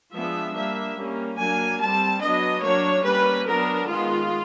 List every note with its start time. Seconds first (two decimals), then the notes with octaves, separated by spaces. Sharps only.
0.13 F3 G#3 B3 D4 E5
0.55 G3 A#3 D4 E5
0.96 G3 A#3 C#4
1.38 F#3 A#3 D4 G#5
1.80 G3 C4 A5
2.21 F#3 B3 D4 D#5
2.63 F#3 A#3 D4 C#5
3.05 G3 A#3 C#4 B4
3.46 F#3 B3 D4 A#4
3.89 D#3 G#3 B3 F4